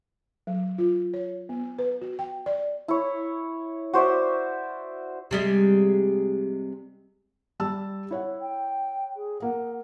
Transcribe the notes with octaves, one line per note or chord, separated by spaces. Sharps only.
F#3
F4
C#5
B3
B4
F#4
G5
D5
E4 C#5
F#4 C5 D5 E5
C3 G3 G#3
G3 A5 E6
E4 C#5 F#5
G5
G#4
A#3 F#5